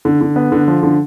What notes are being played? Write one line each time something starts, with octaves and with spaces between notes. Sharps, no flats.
D3
D3
B3
D3
F3
D3